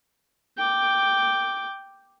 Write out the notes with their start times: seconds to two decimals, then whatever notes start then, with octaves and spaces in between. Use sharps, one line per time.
0.57 G5 D6